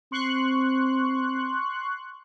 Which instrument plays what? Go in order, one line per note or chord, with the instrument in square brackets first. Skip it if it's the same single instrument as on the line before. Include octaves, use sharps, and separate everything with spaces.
[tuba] C4 [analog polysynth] C6 C#6 F#6